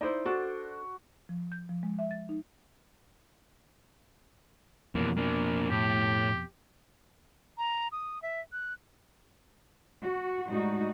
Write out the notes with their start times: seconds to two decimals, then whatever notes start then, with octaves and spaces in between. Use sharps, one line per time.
0.01 D#4 E4 C5 D5
0.25 D4 F#4 A4
1.29 F3
1.52 G6
1.69 F3
1.83 G#3
1.99 E5
2.11 A6
2.29 D#4
4.95 F2 B2 E3 A#3
5.17 A#3 D4
5.70 A2 G4
7.58 A#5
7.92 D#6
8.22 E5
8.52 F#6
10.02 F#4
10.49 A2 G3 G#3 D#4 F#4